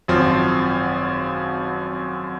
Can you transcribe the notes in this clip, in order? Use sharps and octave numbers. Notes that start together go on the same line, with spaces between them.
G#1 F#2 F3 C4 F4